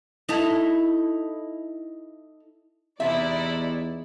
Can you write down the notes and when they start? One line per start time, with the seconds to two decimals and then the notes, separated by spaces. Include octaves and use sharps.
0.29 D#4 E4 A4
3.00 E2 C3 D#4 E4 D5 E5